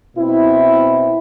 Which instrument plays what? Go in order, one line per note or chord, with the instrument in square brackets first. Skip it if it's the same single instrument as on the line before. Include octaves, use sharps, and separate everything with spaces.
[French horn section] B2 C4 E4